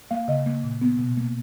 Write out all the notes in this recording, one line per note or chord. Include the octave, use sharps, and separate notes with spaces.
A#3 F5
C#3 D#5
A#3
A#2
B3
B2
A#3